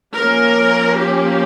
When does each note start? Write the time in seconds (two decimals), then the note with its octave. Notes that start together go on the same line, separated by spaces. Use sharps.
0.15 F3 A#3 C#4 A#4
0.99 G4